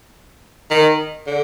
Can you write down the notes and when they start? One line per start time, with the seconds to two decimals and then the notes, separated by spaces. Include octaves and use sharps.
0.70 D#3
1.27 D3